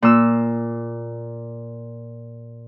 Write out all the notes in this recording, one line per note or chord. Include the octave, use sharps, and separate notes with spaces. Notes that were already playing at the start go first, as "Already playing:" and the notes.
A#2 E6